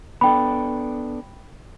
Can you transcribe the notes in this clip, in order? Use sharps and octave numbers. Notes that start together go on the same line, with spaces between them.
B3 D4 A4 G5 B5